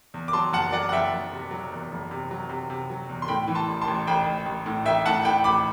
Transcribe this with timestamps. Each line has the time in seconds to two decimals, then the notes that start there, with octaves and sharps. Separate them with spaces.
0.14 E2
0.28 D6
0.33 F#3 A5 C6
0.53 F#1 F#5 A5
0.72 F#3 D5 F#5
0.89 F#5
0.92 F#1 E5 G5
1.13 F#1
1.32 C3
1.51 F#3
1.72 E2
1.92 F#1
2.11 C3
2.31 F#3
2.49 C3
2.70 C3
2.90 F#3
3.10 E2
3.22 C6
3.28 A2 G5 B5
3.48 E3
3.55 A5 C6
3.68 A1
3.81 A5 C6
3.88 A1
4.07 A1 G5 B5
4.26 A1
4.46 A1
4.66 A2
4.85 A1 E5 G5
5.06 A2 F#5 A5
5.25 A2 G5 B5
5.44 A1 B5 D6